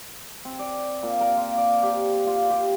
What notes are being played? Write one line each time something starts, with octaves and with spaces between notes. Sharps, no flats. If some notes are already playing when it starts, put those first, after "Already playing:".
C4
D5
A#2
A#4
F4
D5
G4
F4
G4